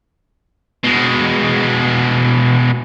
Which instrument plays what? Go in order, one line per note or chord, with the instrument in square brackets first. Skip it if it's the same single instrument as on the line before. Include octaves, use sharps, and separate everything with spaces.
[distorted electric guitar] B2 G#3